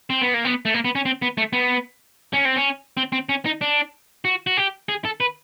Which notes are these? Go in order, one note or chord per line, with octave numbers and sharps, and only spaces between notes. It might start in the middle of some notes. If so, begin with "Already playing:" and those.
C4
B3
A#3
B3
A3
A#3
B3
C#4
C4
B3
A3
B3
C#4
C4
C#4
C4
C4
C#4
D#4
D4
F#4
F#4
G4
G#4
A4
B4